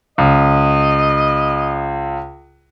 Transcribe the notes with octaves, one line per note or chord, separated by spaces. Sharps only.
C#2 D#5